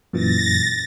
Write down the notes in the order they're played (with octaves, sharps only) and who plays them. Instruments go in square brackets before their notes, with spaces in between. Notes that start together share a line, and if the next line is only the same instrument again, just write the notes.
[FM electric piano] F#2 A#2 E3 [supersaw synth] A6 A#6